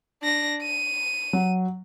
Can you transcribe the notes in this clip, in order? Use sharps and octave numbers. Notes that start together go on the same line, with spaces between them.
D4 A#6
D#7
F#3